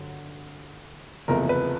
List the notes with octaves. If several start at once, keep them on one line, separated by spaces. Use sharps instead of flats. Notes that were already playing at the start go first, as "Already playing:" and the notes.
Already playing: G2 D3 F#3
F#1 E2 C3 F3 A3 A#4
B4